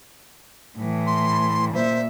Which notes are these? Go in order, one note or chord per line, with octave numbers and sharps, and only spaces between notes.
A2 E3
C6
A#2 C5 E5